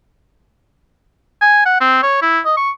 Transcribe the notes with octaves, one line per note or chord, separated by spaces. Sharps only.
G#5
F#5
C4
C#5
E4
D#5
C#6